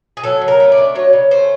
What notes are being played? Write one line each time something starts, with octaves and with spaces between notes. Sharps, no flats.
G#4
F#3 A4
C#3
A#4
A3
D5
D4
F#3 C#5
C#3
A3 C5